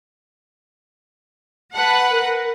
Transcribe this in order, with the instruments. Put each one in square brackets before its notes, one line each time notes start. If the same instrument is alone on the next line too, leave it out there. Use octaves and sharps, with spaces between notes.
[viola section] B4 F#5 [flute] A5
[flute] A#4